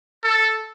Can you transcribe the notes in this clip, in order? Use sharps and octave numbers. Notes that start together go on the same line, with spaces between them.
A4